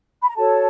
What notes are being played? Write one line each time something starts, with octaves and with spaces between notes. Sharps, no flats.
B5
A#5
F#4 A4 C#5 A5